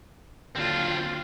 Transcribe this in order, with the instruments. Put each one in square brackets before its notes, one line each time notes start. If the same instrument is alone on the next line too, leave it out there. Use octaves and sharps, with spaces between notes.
[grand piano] D#2 D3 F#3 [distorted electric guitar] C4 D4 [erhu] F4